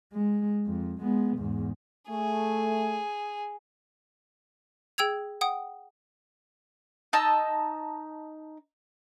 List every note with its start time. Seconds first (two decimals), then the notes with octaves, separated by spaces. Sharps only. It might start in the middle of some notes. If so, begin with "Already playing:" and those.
0.13 G#3
0.67 F2
1.01 G#3 B3
1.38 E2 G#2
2.10 A3 G#4
4.98 G#4 G5 E6 G#6 F7
5.41 F#5 G5 D#6
7.13 D#4 D#5 A5 E6